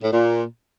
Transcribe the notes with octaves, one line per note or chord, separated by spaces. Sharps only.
A2
A#2